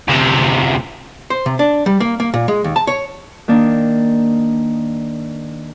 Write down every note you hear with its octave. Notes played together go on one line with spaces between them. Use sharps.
D2 C3
C5
C3
D4
G3
A#3
A#3
A#2
G#3
D#2
A5
C#5
D#3 A#3 D4 D#4